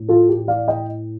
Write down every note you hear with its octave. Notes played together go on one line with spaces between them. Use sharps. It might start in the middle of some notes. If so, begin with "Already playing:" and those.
Already playing: A2
F4 A4
G4
D5 F5
D#5 G5